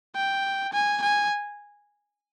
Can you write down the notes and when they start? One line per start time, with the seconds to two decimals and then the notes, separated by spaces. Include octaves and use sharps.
0.16 G5
0.73 G#5
1.02 G#5